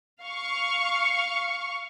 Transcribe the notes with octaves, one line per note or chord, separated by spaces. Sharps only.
F5 C#6